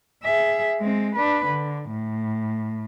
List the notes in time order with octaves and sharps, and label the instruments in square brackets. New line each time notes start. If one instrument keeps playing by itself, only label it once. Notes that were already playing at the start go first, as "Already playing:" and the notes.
[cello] G#4 E5
G#3 C4
D4 B4
D3
A2